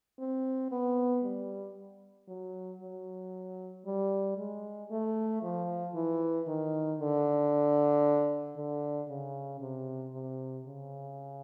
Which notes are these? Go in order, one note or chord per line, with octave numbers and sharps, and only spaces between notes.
C4
B3
G3
F#3
F#3
G3
G#3
A3
F3
E3
D#3
D3
D3
C#3
C3
C3
C#3